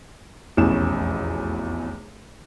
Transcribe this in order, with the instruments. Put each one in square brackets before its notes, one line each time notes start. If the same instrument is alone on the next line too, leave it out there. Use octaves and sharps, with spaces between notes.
[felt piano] F1 B1 E2 A2 C#4 E7